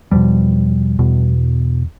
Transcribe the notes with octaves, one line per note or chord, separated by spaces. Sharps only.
E2 B2 F3 G3
E2 B2